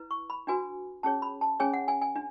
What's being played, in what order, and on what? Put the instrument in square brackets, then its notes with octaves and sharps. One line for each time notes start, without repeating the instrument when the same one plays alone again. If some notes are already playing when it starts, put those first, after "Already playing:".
Already playing: [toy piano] E4 B4
C#6
B5
D4 F#4 B4 G#5
C#4 G#4 C#5 A5
B5
A5
C#4 G#4 C#5 G#5
F#5
G#5
G#5
D4